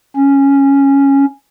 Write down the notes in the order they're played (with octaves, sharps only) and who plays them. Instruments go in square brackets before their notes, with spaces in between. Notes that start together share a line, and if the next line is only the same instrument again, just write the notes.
[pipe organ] C#4